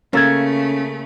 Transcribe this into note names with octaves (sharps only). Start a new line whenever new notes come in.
C#3 A3 A#3 C#4 A4 G#6